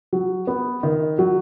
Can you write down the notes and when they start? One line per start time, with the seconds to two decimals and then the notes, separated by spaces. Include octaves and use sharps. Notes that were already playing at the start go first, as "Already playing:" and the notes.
0.13 F#3
0.47 B3
0.83 D#3
1.19 F#3